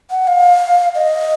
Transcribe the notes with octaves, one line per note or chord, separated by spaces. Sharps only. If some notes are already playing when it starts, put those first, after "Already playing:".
F#5
F5
D#5